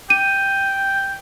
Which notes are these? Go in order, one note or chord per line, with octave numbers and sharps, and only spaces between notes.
G5 D#7